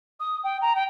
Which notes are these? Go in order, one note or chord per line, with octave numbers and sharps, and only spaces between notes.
D#6
G5
A#5
G5